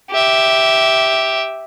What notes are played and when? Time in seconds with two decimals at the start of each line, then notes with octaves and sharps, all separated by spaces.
0.11 G4 E5